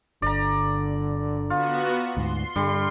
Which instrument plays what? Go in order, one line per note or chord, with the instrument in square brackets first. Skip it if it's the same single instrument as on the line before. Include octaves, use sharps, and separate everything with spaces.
[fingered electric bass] G1 [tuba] D3 [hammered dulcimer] D5 A#5
[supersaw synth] B3 F#4 [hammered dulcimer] F4
[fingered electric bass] D2 G#2 [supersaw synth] C6
[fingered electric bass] G2 [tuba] D3 [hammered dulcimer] G3